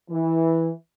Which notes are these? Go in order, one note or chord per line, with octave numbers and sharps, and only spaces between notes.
E3